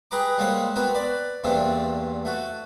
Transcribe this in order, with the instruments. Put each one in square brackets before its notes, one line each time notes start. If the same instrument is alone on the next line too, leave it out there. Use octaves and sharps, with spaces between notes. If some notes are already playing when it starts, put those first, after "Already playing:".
[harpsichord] G4 G#4 B4 A#5 D6
G3 G#3 A#3 C4 C#5 F#5
B3 C4 F#4 A#4
B4 D5
E2 G2 A#2 A3 C4 D4
A3 F#4